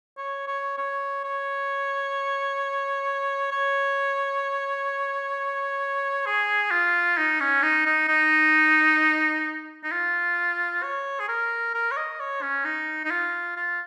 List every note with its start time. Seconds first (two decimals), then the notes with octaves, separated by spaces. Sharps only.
0.17 C#5
0.47 C#5
0.78 C#5
1.24 C#5
3.52 C#5
6.26 G#4
6.71 F4
7.17 D#4
7.40 C#4
7.63 D#4
7.86 D#4
8.08 D#4
9.84 D#4
9.92 F4
10.83 C#5
11.20 G#4
11.29 A#4
11.74 A#4
11.92 C#5
11.97 D#5
12.20 C#5
12.42 C#4
12.65 D#4
13.05 D#4
13.11 F4
13.57 F4